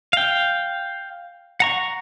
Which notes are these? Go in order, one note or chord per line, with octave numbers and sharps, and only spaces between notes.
F5 G5
F#5 A#5 C#6